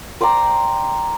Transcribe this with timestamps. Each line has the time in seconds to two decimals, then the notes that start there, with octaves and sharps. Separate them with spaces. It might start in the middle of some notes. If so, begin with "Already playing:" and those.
0.21 C5 D5 G5 A#5